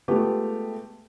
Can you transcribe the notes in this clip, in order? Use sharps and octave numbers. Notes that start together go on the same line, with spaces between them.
G#3 A3 B3 F4 G4